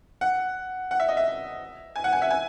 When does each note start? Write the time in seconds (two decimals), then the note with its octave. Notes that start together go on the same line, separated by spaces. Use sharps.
0.21 F#5
0.91 F#5
1.00 E5
1.09 D#5
1.17 E5
1.96 G#5
2.04 F#5
2.13 G#5
2.22 E5
2.30 G#5